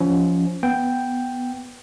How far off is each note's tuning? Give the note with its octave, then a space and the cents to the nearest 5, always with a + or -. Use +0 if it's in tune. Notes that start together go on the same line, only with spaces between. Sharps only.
F3 +0 C#4 +25
B3 +0 G5 +0